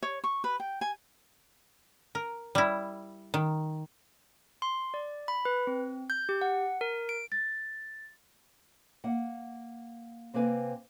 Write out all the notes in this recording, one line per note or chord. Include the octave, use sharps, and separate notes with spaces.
C#5
C#6
B4
G5
G#5
A#4
G3 E4
D#3
C6
D5
B5
B4
C4
G6
G4
F#5
A#4
D7
A6
A#3 F#5
C3 A#3 C4 B4 G#5